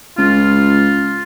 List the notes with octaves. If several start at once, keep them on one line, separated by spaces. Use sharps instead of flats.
C#2 F4